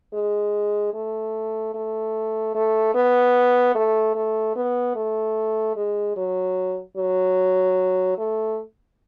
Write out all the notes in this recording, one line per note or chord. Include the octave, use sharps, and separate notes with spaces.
G#3
A3
A3
A3
B3
A3
A3
B3
A3
G#3
F#3
F#3
A3